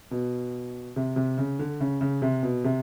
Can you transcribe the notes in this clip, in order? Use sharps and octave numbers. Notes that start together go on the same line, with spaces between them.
B2
C3
C3
C#3
D3
C#3
C#3
C3
B2
C3